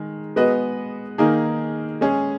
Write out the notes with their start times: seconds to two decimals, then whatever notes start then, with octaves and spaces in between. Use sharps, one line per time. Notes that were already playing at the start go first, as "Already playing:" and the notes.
Already playing: D#3 G#3
0.36 G#3 B3 F#4 B4 D#5
1.18 D#3 A#3 D#4 G#4
2.01 G#3 C#4 G#4